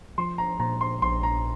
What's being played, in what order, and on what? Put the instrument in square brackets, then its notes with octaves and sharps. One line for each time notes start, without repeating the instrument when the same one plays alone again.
[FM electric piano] F3 [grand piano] C6
[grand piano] A#5
[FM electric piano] A#2 [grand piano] A#5
[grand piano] C6
[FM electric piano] A#1 [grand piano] C6
[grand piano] A#5